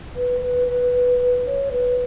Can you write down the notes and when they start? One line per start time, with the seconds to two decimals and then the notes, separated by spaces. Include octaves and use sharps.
0.15 B4
0.41 B4
0.68 B4
1.46 C#5
1.72 B4